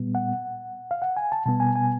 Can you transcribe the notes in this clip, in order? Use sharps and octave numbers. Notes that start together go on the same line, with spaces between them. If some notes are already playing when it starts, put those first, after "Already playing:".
Already playing: A#2 G3 B3
F#5
F5
F#5
G#5
A5
B2 G3 B3 A5
G#5
G#5